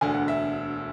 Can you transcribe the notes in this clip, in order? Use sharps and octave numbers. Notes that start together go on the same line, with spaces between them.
E1 D2 D3 G#5
F#5
E5